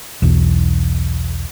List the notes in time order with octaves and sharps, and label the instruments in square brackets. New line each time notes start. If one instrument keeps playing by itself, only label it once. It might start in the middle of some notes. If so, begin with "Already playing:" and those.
[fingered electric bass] B1 E2